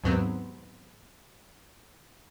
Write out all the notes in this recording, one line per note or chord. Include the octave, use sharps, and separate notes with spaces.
D#2 G#2 F#3 B3 C4